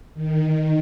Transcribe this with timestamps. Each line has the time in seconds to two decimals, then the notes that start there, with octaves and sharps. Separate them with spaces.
0.14 D#3